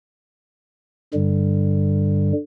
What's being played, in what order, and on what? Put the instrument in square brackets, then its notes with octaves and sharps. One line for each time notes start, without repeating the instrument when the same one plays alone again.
[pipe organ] G2 D3 G3